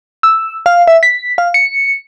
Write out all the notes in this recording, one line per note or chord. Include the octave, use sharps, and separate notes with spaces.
E6
F5
E5
B6
F5
C#7